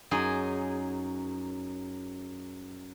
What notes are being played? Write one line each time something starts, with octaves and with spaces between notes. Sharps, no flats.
F#2 D#4 G#4